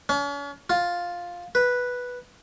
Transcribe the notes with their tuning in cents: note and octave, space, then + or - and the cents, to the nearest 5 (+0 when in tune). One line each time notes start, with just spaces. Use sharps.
C#4 +40
F4 +5
B4 -5